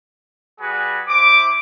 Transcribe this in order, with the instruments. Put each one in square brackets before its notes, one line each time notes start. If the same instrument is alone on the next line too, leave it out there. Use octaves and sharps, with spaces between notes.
[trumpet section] G3 F#4 G#4 B4
E4 C5 D6